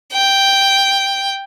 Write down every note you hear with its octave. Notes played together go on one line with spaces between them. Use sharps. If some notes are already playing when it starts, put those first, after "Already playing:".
G5